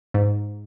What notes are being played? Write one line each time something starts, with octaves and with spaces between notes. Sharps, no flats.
G#2